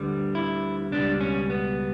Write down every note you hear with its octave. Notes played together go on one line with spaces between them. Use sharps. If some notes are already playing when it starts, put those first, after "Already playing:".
Already playing: D2 D3 G3 B3
E4
C#2 B2 G3 D4
C#4
B3